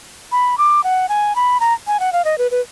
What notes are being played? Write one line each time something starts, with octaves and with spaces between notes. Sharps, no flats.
B5
D6
F#5
G#5
B5
A#5
G#5
F#5
F5
D#5
B4
B4